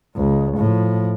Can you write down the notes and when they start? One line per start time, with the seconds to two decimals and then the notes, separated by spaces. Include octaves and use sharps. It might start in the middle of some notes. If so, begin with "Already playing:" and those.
0.16 C#2
0.57 A2 F3